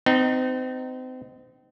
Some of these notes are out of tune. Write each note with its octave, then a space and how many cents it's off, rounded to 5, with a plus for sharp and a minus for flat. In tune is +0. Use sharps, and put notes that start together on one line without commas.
C4 -35 D#4 -10